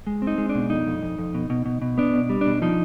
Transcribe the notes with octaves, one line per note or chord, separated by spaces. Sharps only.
G#3
C4
D#4
G#3
D4
B2
F2 D#4
F2
F2
F2
B2
B2
B2
B2
B3 D4
B2
G3
B2 D4
F3 D#4